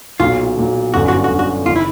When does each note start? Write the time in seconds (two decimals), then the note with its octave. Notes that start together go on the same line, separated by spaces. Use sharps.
0.20 B1 A#2 F#3 F4
0.56 B1 A#2 F#3
0.93 G1 F#2 D3 F#4
1.08 F#4
1.24 F#4
1.30 G1 F#2 D3
1.39 F#4
1.66 F#1 D#3 F4
1.76 E4